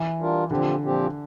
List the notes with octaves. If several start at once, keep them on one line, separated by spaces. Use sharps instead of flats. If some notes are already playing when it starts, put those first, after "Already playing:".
Already playing: E3
G3 D4 F4 A#4
A#2 D3 F3 C4 G4
A#2 F3 C4 G4